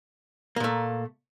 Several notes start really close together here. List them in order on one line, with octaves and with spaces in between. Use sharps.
A#3 A#2 A3